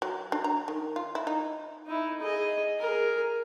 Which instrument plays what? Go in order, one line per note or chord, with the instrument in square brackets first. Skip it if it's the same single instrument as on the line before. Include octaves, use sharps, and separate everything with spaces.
[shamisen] F#3
D4
A#5
D#3
F4
E4
D#4
[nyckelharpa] D#4 E4
G#4 D#5
G#4 A#4